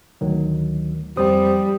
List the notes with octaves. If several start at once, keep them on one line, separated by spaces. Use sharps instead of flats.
D2 D#3 F#3
F2 G3 C5 D#6